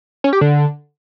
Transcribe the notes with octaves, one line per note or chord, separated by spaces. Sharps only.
C#4
G4
D3